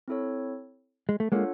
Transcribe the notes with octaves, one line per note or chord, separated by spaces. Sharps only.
C4 E4 A4 C#5
G#3
A3
G#3 A#3 D4 F4 A4 C#5 F#5